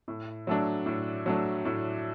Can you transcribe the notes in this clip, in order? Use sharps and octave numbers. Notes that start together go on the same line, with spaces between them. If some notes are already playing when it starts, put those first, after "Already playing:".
A2
F#3 A3 D4
A2
F#3 A3 D4
A2